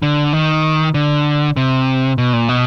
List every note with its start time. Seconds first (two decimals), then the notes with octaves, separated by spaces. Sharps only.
0.02 D3
0.33 D#3
0.94 D3
1.57 C3
2.18 B2
2.33 A#2
2.49 B2